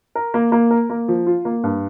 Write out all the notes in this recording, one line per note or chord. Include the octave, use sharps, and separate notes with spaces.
A#4
A#3
A#3
A#4
A#3
F3
F4
A#3
G2